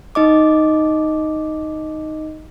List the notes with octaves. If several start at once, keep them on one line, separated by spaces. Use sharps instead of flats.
D#4 D#5 D6